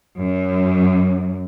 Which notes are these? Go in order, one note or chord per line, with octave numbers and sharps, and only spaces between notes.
F#2